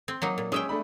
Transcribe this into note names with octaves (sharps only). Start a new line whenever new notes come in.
C4
F#3 A#3 D#4
A#2
G#3 C#4 E5 G5 D#6
A3 D4 B5